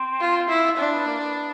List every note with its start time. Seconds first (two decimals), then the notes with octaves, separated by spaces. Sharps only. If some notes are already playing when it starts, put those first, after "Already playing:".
Already playing: C4
0.21 F4
0.49 E4
0.77 C4 D4
0.91 B3
1.06 A#3
1.20 B3